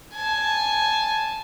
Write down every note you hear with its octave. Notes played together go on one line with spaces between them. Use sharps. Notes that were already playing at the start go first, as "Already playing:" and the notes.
G#5 A5